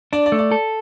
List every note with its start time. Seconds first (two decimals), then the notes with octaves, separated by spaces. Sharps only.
0.13 D4 D5
0.26 D5
0.32 A3
0.39 D5
0.52 A4